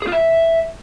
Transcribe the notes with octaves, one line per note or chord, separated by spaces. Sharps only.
G#4
F4
E5